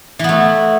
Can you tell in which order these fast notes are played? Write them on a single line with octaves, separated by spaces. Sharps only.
E3 B3 A3